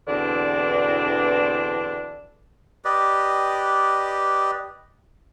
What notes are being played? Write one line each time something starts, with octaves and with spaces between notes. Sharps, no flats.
E2 B2 D3 E3 C4 D4
G4 B4 D5 D#5